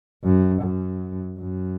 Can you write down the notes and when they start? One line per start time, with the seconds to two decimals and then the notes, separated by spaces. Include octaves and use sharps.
0.24 F#2
0.62 F#2
1.40 F#2